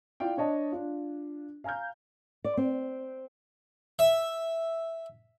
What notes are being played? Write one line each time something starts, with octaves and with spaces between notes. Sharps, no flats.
E4 F4 D5 F5 G5
D4 C#5 D#5 A5
D4 F4
F5 G#5 A#5 F6 G6
D5
C4
E5